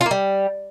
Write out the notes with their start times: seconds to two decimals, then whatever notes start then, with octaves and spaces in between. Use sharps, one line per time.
0.01 F4
0.06 A#3
0.11 G3